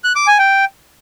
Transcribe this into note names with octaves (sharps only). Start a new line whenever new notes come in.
F#6
D6
G#5
G5